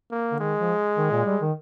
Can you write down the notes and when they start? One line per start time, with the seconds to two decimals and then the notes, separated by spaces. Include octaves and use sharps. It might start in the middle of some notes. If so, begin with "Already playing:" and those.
0.11 A#3
0.32 D3
0.40 D#3 G#3
0.59 F3
0.97 D#3
1.11 A#2
1.26 G3
1.41 D#3